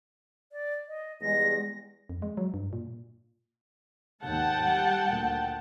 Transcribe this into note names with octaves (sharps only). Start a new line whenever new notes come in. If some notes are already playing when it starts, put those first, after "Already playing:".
D5
D#5
E2 G3 G#3 A#6
F2
G#3
F#3
G2
A#2
D#2 G#2 F#5 G5 A5
G3
D2 A#2